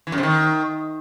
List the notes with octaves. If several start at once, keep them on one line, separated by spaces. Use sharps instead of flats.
E3
F#2
C3
D#3